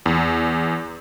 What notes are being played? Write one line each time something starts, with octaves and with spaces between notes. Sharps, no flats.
E2